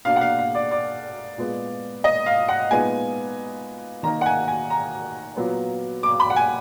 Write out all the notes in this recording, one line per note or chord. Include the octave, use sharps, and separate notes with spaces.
B2 A#3 D4 F5
F#5
F5
F5
D5
D5
A#2 G#3 B3
D#5
F5
F#5
A#2 G#3 B3 D#4 G#5
D#3 A#3 D#4 A#5
F#5
G#5
G#5
A#5
A#2 F#3 B3
D6
B5
F#5
G#5